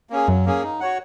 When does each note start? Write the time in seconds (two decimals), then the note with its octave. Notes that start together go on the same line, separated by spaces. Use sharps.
0.10 A#3 C#4 G#4
0.28 F#2 F#3
0.45 A#3 C#4 G#4
0.63 D#4
0.80 F#4 C#5 F#5